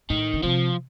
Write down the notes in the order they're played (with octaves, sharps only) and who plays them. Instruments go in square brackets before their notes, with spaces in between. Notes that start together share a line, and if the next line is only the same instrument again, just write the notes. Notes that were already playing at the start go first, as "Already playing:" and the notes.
[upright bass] A2 [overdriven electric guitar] D#3
[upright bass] D3
[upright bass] C3 [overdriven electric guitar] F3